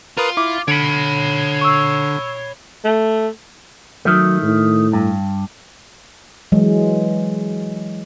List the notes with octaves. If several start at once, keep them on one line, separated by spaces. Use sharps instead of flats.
F4 A#4 B4 D#6
E4 D6
D3 C#5 B5 B6 C#7 D7
C#6 E6
A3
D#3 F#3 A3
A2
G2
E3 F#3 G#3